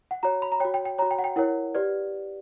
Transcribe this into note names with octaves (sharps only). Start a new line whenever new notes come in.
F#5
F#4 C#5 A#5
B5
A#5
F#4 C#5 G5
G5
G5
F#4 C#5 A#5
G5
F#5
G5
E4 A#4 C#5 F#5
G4 B4 D5